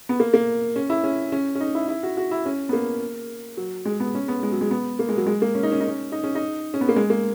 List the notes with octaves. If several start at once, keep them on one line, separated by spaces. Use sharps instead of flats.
B3
A#3
A#3
C#4
E4
C#4
C#4
C#4
D#4
E4
E4
F#4
F#4
E4
C#4
B3
A#3
F#3
G#3
B3
C#4
B3
G#3
F#3
G#3
B3
A#3
G#3
F#3
G#3
A#3
C#4
D#4
C#4
D#4
C#4
D#4
C#4
D#4
C#4
B3
A#3
G#3
A#3